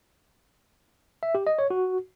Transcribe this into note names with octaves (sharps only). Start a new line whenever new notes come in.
E5
G4
D#5
C#5
F#4